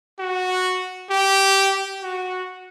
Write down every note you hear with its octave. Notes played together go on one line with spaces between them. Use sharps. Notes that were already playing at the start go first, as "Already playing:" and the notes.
F#4
G4
F#4